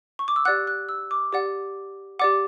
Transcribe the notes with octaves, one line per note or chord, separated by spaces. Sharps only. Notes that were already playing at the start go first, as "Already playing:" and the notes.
C#6
D6
E6
G4 D5 F#5 F#6
F#6
E6
D6
G4 D5 F#5 D6
G4 D5 F#5 D6